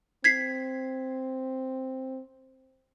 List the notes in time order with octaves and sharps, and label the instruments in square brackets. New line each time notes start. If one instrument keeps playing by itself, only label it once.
[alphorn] C4 [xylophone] G#6 B6 C7